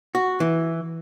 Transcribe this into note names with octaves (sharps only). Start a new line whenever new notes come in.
F#4
E3